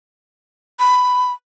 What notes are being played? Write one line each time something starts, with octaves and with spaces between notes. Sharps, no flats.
B5